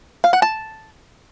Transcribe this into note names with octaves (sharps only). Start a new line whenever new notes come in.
F5
F#5
A5